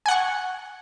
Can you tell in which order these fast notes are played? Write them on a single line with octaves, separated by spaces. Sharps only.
G#5 F#5 C#6